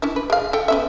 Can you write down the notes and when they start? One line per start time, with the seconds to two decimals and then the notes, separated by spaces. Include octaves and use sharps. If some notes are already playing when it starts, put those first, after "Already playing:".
0.02 C#4 D4 E4
0.16 B4
0.30 G#3 F5
0.53 A4 E5 G5
0.68 B3 C#4 E5